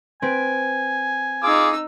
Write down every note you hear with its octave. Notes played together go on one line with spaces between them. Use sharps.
C4 B4 G#5 D7
D#4 F4 G#4 D6 E6